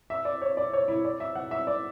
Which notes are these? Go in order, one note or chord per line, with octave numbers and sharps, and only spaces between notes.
E5
D5
C#5
D5
C#5
E4
D5
E5
F#5
E5
D5